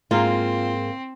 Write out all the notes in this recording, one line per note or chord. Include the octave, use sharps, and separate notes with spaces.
G#2 A#3 C4 F4 G#4